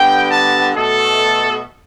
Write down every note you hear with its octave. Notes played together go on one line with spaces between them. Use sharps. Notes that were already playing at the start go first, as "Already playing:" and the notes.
Already playing: D3 G3 B3 G5
A5
B2 A3 A4